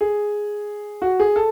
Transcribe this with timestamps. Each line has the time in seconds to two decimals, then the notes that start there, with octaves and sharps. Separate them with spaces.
0.01 G#4
1.02 F#4
1.20 G#4
1.36 A4